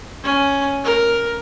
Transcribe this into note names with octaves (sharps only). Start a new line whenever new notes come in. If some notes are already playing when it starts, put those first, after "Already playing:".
C#4
A#4